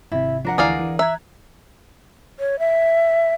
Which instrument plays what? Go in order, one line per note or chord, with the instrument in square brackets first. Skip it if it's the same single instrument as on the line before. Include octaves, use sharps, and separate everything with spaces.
[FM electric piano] G#1 C3 [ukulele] E4
[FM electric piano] F3 [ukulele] D4 A#4 F#5
[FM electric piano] D2 E3 A#5 [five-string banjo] G#4 D5 F5
[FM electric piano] E3
[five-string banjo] E5 [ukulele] A#5 [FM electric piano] F#6 G#6
[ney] C#5
E5